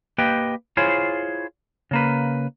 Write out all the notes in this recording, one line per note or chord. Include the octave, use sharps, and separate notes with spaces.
A#3 G4 B4 D#5 G5
E4 F4 G#4 C5 C#5
C#3 A#3 B4